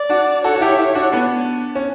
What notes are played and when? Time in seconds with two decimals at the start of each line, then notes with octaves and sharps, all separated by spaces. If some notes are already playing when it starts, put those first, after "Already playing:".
Already playing: D5
0.09 D4 F#4
0.44 F#4 A4 C#5
0.55 F#4
0.61 E4 G4
0.79 E4 G4
0.95 D4 F#4
1.12 B3 D4
1.75 C#4